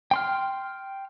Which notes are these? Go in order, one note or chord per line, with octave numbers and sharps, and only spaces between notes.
G5 C6 F6